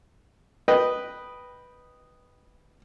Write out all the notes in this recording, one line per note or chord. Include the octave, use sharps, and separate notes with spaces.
B4 D#5 G5